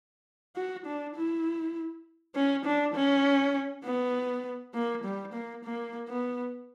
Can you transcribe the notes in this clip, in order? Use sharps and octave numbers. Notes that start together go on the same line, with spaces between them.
F#4
D4
E4
C#4
D4
C#4
B3
A#3
G3
A#3
A#3
B3